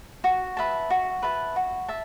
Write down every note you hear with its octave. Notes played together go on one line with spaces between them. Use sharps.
F#4
B4 E5 A5
F#4
B4 E5 A5
F#4
E5 A5